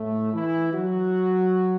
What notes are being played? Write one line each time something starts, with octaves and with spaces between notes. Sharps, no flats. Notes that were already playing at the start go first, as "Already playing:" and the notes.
Already playing: A2 A3
E3 E4
F#3 F#4